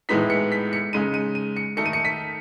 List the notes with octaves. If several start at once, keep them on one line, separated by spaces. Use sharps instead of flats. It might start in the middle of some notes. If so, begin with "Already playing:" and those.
A2 E3 G#3 B3 D#4 B6
C#7
B6
C#7
C#3 G#3 D#4 D#7
D#7
D#7
C#7
D#3 A3 D#4 C#7
D#7
C#7
B6